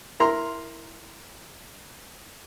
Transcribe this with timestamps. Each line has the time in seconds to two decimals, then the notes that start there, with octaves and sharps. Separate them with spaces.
0.20 E4 A#4 A#5 C6